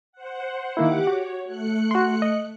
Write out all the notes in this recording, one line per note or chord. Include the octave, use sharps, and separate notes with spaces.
C5 F#5
D#3 A#3 E4 G4 F#5 D6
F#4 C#5
A3 F#6 C#7
F#4 C6
D#5